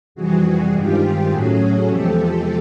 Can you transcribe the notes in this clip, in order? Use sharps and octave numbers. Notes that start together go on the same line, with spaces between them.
F2 C3 E3 G3 F#4 G#4
G2 D#3 G#3 C4 F4 G4
A2 F#3 A3 C#4 F#4 G#4
E2 C3 F3 G#3 G4 A4